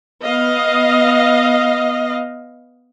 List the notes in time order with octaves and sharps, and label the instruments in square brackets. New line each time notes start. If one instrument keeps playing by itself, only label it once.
[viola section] B3 D#5 F5